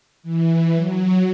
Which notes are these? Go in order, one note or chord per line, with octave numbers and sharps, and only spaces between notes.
E3
F#3